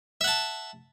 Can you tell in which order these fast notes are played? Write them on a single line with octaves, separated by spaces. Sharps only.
E5 F#5 A5